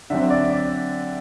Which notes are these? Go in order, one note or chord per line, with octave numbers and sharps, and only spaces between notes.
D3 F#3 C4 E5
D5
D5